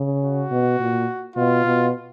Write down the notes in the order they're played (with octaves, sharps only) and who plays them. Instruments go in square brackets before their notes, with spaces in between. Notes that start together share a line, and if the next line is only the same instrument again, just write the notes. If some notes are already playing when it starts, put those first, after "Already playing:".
Already playing: [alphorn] C#3
[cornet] F#4
[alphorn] B2
A#2
[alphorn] B2 [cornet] F4
[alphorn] B2